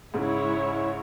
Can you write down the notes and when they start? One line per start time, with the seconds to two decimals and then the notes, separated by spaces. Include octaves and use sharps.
0.14 G#2 C#3 G#3 E4 C#5